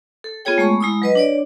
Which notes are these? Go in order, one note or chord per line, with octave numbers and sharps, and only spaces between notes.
A4
B3 F4 G#4 C#5 G5
G#3 A3 B5 C#6
G#3 E4 B5 D#6
F#3 B4 D#5
D4 C#5 D5